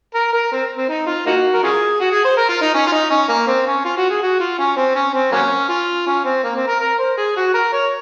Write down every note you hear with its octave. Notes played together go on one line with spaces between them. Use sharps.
A#4
A#4
C4
C4
D#4
F4
A#3 D#4 F#4
A#4
C#4 F4 G#4
F#4
G#4
C5
A#4
F4
D#4
C#4
F4
D#4
C#4
A#3
C4
C#4
F4
F#4
G#4
F#4
F4
C#4
C4
C#4
C4
F#3 A#3 C#4
F4
C#4
C4
A#3
C4
A#4
A#4
C5
G#4
F#4
A#4
C#5